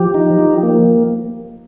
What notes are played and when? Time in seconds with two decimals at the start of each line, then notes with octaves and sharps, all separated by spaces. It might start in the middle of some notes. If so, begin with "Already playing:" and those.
Already playing: F3 G4
0.14 D#4
0.39 F3
0.63 A#3